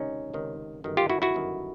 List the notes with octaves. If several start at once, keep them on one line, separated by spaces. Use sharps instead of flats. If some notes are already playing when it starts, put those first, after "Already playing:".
Already playing: C#2 C3 D#3 C#4 D#4
C#2 C3 D#3
G1 F#2 D#3
F4 G4
E4 F#4
E4 F#4
G1 F#2 D#3